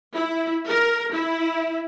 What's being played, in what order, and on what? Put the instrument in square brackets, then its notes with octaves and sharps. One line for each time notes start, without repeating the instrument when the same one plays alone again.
[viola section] E4
A#4
E4